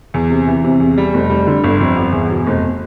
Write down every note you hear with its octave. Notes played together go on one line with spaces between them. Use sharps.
E2
C3
E3
C3
E2
G3
F1
G3
D3
G1
F2
G1
E2
B2
F1